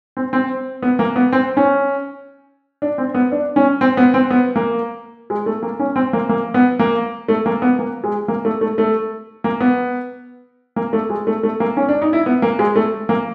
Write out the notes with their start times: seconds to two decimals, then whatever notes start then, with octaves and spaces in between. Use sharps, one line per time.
0.17 C4
0.33 C4
0.82 B3
0.99 A#3
1.16 B3
1.32 C4
1.57 C#4
2.82 D4
2.98 C4
3.15 B3
3.32 D4
3.56 C#4
3.81 C4
3.97 B3
4.14 C4
4.30 B3
4.56 A#3
5.30 G#3
5.46 A3
5.63 A#3
5.79 C#4
5.96 C4
6.13 A#3
6.29 A#3
6.54 B3
6.79 A#3
7.28 A3
7.46 A#3
7.62 B3
7.79 A#3
8.04 G#3
8.28 A#3
8.45 A3
8.61 A3
8.78 A3
9.44 A#3
9.60 B3
10.76 A#3
10.93 A3
11.10 G#3
11.27 A3
11.43 A3
11.60 A#3
11.77 C#4
11.89 D4
12.02 D#4
12.13 E4
12.26 B3
12.42 A#3
12.59 G#3
12.76 A3
13.09 A#3